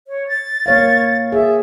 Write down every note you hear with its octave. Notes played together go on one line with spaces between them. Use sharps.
C#5
A6
A#3 C#5 F5
G#4 E5